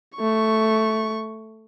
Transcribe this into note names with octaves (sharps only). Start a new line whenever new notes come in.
A3 C#6